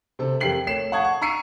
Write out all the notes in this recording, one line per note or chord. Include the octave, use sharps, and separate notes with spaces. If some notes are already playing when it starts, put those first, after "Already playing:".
C3 C4 A4
F2 G4 A#4 G5 C7 F#7
A3 C#5 C7 E7
F#5 A5 C#6 D#6 G#6
C#6
A#5 C#6 E6 C7 C#7 D#7